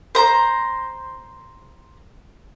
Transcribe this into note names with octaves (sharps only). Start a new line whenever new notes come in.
C5 A#5